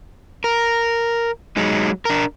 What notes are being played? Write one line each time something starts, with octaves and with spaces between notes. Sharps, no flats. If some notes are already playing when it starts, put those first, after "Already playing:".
A#4
F#3 G#3 D#4
D4 A#4